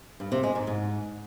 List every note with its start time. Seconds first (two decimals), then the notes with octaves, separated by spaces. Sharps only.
0.20 G2
0.32 C3
0.43 G#3
0.55 G#2
0.67 G#2